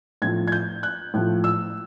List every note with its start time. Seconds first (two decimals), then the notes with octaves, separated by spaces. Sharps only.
0.22 A2 F3 G#6
0.48 G#6
0.52 G6
0.83 F#6
1.14 A2 F3
1.44 E6